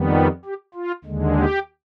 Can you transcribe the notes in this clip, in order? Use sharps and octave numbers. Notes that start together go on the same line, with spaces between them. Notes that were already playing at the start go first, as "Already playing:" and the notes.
Already playing: F2 D#3 G3 B3
G4
G4
F4
D#2 D3 G#3
G4